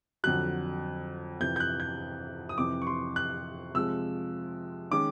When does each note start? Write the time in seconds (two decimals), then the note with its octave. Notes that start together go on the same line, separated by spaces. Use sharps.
0.24 F2 D3 F#3 F#6
1.40 F2 C3 E3 G6
1.56 G6
1.60 F#6
1.80 G6
2.49 D#6
2.57 F2 C3 E3 D6
2.82 C#6
2.87 C6
3.16 F#6
3.74 C3 F3 G#3 C4 E6
4.91 D#3 G#3 C#4 D6